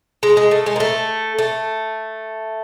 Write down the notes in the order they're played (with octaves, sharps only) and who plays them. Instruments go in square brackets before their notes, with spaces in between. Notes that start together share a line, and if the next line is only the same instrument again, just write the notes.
[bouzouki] G#3
G#3
A3
G#3
A#3
A3
A3